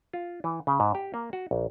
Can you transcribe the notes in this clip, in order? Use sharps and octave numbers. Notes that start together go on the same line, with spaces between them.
F4
E3
C#3
G#2
G4
A#3
F#4
A#1